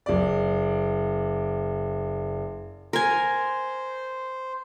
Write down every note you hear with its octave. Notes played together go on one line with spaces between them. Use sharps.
F#1 D5
A#4 C5 G#5